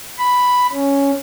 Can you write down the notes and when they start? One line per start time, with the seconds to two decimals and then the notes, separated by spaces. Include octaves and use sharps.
0.19 B5
0.73 C#4